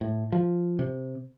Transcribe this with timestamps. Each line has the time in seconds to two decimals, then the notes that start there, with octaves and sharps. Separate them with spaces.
0.01 A2
0.32 F3
0.79 C3